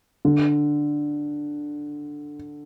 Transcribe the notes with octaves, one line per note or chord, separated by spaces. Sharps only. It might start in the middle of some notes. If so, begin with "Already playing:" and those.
D3